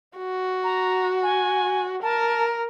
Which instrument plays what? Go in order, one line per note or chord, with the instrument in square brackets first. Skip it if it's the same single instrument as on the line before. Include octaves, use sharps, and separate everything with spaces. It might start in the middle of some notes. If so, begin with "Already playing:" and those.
[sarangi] F#4
[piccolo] A#5
G#5
[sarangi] A#4 [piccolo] A5